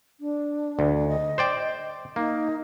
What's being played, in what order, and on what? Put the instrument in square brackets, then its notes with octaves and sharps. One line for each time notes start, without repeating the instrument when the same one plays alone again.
[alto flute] D4
[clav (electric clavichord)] D2
[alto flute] D#5
[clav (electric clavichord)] C5 D5 G5
[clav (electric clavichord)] A#3 [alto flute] D#4